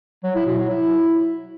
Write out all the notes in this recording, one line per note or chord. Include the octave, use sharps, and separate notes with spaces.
F#3
E4
B2
F#3
E4